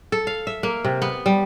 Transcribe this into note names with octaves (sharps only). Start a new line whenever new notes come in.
A4
F5
E5
A#3
C3
B3
G3